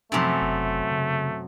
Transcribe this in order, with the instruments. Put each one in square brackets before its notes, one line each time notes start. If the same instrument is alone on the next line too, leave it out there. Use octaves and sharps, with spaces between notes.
[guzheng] F#2 C3 [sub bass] F3 [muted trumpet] A3
[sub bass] F#1
C#3